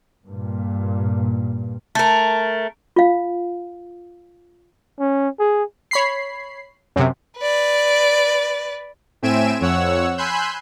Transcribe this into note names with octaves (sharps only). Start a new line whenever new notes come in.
G2 A#2
A3 A#4
F4 F5
C#4
G#4
C#5 B5 C7
F#2 C3
B4 D5
A2 C4 E5 G#5 D7 E7
F2 C#5 F#5 E6
G#5 B5 C6 E6 F#6 G6